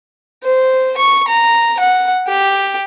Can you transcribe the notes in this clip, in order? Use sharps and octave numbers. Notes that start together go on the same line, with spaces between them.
C5
C#6
A#5
F#5
G4